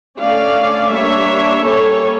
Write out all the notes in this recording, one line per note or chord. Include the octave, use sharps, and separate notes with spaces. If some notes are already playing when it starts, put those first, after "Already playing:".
D3 A3 C#4 D5 F5
G3 A#3 D4 C#5 E5
G3 A#3 C#4 A4 C#5